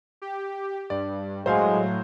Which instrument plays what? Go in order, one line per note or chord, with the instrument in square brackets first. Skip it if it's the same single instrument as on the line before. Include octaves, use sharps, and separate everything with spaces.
[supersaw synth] G4
[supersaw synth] G2 [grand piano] D5
[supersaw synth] A2 F#3 [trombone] G#3 [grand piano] C5 F5 G#5